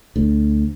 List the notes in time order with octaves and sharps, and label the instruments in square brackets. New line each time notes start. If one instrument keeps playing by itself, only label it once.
[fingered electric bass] D2